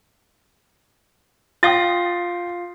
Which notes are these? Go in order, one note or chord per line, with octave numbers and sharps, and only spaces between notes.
F4 F5 G5 D#6 A6